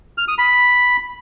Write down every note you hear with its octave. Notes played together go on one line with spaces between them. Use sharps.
F6
D#6
B5